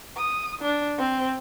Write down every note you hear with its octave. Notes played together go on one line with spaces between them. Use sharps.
D#6
D4
C4